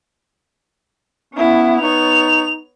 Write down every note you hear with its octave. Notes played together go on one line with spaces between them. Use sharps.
B3 C#4 E4
B3 D#4 C#5 F7